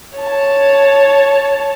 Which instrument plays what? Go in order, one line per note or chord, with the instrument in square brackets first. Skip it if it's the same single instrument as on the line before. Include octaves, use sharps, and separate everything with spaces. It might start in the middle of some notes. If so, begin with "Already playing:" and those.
[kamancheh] C#5 A5